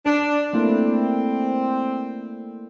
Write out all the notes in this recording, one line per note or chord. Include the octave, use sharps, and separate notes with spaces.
D4 D5
A3 A#3 C4 E4